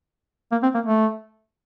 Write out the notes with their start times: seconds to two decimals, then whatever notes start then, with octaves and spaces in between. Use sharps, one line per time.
0.52 A#3
0.63 C4
0.74 A#3
0.86 A3